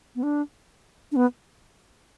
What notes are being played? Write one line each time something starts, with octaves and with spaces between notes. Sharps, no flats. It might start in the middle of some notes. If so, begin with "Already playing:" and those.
B3
D4
D4
B3